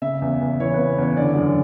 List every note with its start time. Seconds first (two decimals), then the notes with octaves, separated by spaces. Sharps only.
0.02 C#3 E5
0.22 E2
0.41 E2
0.60 E3 C#5
0.74 C#3 B4
0.98 E2 C#5
1.17 D3 D5
1.36 F#2